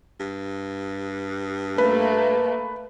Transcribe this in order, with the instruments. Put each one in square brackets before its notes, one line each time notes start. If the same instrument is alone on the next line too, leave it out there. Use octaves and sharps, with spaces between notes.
[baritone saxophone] G2
[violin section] A3 A#3 [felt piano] B4